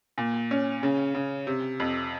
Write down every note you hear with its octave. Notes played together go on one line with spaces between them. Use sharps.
A#2
C#4
C#3
C#3
C3
F2